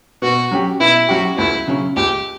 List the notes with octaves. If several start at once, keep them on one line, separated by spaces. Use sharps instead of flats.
B2 F#4
F#3 C#4 G4
B2 E4
F#3 C#4 F#4 G4
C#2 E4
C#3 F#3 C#4
C#2 G4